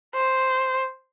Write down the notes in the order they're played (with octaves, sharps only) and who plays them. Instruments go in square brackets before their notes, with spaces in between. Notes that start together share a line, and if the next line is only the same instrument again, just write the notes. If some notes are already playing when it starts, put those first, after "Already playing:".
[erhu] C5